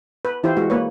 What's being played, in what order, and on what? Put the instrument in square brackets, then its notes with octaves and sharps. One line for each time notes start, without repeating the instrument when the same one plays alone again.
[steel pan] B4
E3 E4 F4 G4 C5
G#3 F#4
A#3 B4 C#5